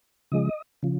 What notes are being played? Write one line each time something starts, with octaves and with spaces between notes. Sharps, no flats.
C#3 F3 G#3 D#5
C#3 F3